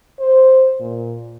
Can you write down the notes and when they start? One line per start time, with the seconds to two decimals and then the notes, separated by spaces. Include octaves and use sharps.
0.20 C5
0.80 A#2